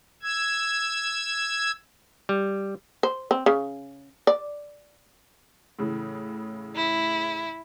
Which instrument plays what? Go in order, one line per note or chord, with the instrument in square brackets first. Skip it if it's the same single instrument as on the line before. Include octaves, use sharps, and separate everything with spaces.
[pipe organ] E6 G#6
[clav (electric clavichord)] G3
[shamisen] C5
C4
C#3
D5
[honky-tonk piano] A2 C#3 E3
[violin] E4